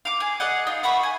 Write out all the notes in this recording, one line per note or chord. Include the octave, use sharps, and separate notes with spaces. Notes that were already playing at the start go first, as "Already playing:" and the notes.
F5 D6
G#4
G#4 D5 D#5 F#5
D#4 F4
E5 F#5 B5 C#6
G#5